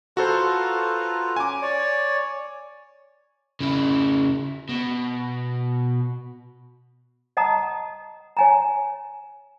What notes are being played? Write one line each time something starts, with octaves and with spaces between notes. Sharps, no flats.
F4 F#4 A4 B4 C5 A#5
C#4 G#5 D6
C#5 D5
C#3 E4
B2
D#5 F#5 A5 A#5 D#6
C#5 G#5 A#5